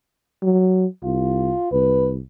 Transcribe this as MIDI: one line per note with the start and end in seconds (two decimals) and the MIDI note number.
0.43 0.85 54
1.04 1.53 36
1.04 1.68 65
1.72 2.21 36
1.72 2.10 71